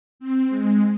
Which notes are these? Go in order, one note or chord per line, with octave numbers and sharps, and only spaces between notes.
C4
G#3